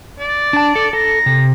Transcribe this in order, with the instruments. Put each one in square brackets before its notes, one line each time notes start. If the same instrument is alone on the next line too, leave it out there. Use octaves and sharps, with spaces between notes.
[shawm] D5
[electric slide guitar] D4 A5
A4
[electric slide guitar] A4 [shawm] A#5
[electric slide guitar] C3